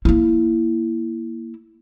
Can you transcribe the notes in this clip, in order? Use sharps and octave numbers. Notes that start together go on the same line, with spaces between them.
A#3 E4